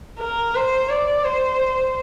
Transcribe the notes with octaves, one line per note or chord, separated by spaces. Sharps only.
A#4
C5
D5
C5